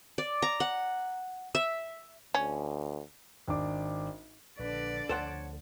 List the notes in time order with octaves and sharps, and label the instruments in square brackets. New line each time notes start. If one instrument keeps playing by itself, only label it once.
[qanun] D5
A#5
F#5
E5
[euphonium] D2 [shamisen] C#4
[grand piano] G#1 D4 D6
[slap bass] A#1 [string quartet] D3 D5 [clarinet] B4
[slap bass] D2 F3 [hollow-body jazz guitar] A4 C5 F#5 [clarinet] C#5